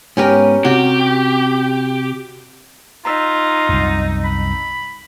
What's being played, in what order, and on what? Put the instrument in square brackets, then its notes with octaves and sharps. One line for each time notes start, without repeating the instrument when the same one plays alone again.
[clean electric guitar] G#2 B3 G5 [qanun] C#4 G4 A#4
[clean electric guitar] C3 [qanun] F#4 [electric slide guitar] G4
[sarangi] D#4 [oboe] F4 [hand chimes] A#5 E6 B6
[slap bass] C2 F#2
[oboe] B5